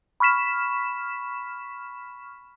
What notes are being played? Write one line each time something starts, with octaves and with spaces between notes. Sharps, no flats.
B5 C#6 F6 B6 E7